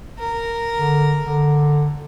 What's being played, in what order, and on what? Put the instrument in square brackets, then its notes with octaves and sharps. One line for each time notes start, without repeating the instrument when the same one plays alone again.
[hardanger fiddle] A#4
[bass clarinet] D3
D3